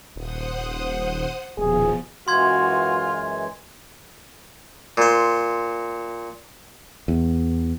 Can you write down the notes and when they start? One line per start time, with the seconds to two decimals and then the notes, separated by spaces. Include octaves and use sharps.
0.16 D#1 C5 F#5 D#6
1.58 D#1 B2 F3 G#4
2.28 F#2 E3 G#3 F4 F#4 C6 G#6
4.97 A#2 C5
7.08 E2